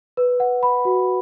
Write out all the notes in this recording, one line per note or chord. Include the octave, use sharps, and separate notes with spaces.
B4
F#5
B5
F#4